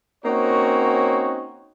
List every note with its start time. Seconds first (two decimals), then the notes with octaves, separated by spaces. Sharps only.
0.25 A#3 C4 C#4 D#4 F#4 C#5